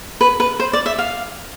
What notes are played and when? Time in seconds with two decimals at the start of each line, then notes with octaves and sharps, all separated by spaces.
0.21 B4
0.40 B4
0.60 C5
0.73 D5
0.86 E5
0.98 F5